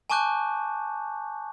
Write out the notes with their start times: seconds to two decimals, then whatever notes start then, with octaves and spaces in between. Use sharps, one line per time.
0.10 G#5 A5 C#6 D6 F#6 G6